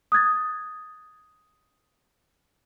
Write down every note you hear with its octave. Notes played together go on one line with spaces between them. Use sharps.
D#6 F#6 G#6 A6